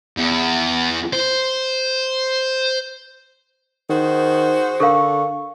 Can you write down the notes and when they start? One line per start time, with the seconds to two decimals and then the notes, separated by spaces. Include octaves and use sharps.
0.17 E2
1.13 C5
3.90 D#3 F#4 G#4 C5
4.80 D3 A4 A#4 F5 C#6